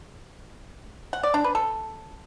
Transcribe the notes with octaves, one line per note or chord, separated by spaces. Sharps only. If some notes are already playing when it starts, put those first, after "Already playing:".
F#5
D5
D4
B4
A4